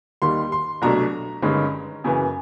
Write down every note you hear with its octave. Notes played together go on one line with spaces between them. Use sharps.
D#2 D#3 G3 C6
C6
C2 B2 F#3 A3 D4 A#5
G1 G2 D#3 G#3 C#4
F#2 C#3 E3